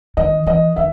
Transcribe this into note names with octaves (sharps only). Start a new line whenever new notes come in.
D#3 D#5
E3 D#5
D#3 E5